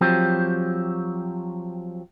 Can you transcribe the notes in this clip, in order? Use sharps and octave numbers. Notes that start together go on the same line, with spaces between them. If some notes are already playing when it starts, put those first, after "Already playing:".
F3 F#3 C4 G4